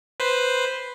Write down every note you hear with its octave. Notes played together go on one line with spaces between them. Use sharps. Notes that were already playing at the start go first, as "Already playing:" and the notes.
B4 C5